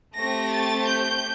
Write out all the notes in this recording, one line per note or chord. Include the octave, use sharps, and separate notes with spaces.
A3 C4 G4 A#6
A6
G6